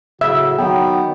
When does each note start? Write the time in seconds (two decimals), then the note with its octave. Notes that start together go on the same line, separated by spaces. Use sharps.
0.21 A2 C#3 F#3 F#4 E5
0.59 D#3 F#3 B3 G5